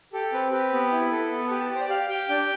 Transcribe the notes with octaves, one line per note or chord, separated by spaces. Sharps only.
G4 A4
C4 B4
G4 B4
B3
E4
A4
B3
A4
G4 B4
A5
G4 C5
D5
G4 F5
G4 G5
D4 G5